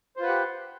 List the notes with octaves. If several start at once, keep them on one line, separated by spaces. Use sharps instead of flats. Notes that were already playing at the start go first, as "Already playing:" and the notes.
F4 G4 B4 C5 F#5